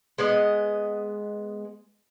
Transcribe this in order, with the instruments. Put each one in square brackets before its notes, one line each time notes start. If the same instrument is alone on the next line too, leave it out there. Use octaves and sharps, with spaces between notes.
[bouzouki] G#3 B3 D#5